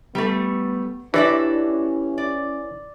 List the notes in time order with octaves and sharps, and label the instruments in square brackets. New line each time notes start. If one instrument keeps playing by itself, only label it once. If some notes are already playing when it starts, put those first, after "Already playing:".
[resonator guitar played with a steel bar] G3 A3 [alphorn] B3
[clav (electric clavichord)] E3 [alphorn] D4 [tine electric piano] E4 G4 C#5 [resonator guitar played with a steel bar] F#4 D5 E5
[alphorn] C#4
[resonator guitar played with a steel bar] D5